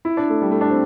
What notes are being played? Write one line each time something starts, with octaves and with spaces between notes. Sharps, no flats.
E4
D4
A3
G3
A3
D4
C4